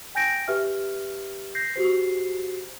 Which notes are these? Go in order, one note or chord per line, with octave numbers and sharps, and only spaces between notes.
G5 G#5 G6 A#6 D7
G4 B4 E5 F6
G6 A#6 C7
F#4 G4 C5 C7